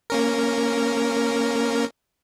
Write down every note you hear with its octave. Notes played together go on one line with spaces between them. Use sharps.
A#3 C#4 A#4